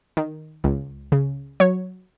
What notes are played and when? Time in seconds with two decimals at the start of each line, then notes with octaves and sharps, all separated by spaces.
0.17 D#3
0.64 C#2
1.12 C#3
1.60 F#3 C#5